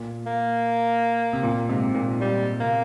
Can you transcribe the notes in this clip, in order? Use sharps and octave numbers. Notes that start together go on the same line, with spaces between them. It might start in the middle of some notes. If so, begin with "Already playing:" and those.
Already playing: A#2
A#3
C3
A#2
G#2 C3
A#2
A#2 G3
C3 A#3